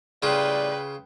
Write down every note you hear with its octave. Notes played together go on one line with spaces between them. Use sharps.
A2 C#3 G3 F4 B4 D5 G5